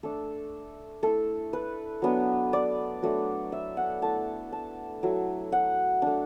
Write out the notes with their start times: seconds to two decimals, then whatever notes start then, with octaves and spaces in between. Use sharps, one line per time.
0.03 A3 D4 A4
1.03 A3 E4 A4
1.53 B4
2.02 F#3 B3 D4
2.53 D5
3.02 F#3 A3 D4
3.52 E5
3.77 F#5
4.02 A3 E4 A5
4.52 A5
5.03 F#3 A3 E4
5.52 F#5
6.02 A3 D4